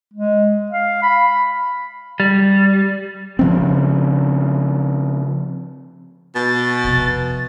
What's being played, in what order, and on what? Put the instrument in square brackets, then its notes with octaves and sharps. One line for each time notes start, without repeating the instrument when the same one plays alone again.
[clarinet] G#3
F5
B5
[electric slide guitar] G3
[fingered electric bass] C#3 F3 C4
[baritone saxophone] B2 [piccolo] A6
[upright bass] F2 C3